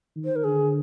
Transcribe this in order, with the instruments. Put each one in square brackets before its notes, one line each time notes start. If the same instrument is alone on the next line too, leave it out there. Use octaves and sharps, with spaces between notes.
[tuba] D#3
[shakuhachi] C5
A#4
[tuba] D3 [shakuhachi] G#4